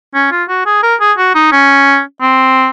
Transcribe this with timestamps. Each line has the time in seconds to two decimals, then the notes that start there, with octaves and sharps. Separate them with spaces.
0.15 C#4
0.32 F4
0.49 F#4
0.66 G#4
0.83 A#4
1.00 G#4
1.18 F#4
1.35 D#4
1.52 C#4
2.21 C4